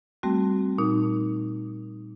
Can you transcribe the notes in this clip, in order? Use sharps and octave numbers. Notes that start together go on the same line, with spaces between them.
G3 A3 C4 F#4
A#2 D#4